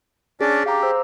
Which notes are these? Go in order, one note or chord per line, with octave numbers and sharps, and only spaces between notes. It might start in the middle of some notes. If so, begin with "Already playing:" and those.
C#4 D4 G#4 D5
G4 F5 A#5 D6
C5 E6